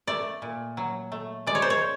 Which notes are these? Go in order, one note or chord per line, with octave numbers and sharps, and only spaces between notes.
A3 D5
A#2
F#3
A3
G#3 D5
C#5
C5
C#5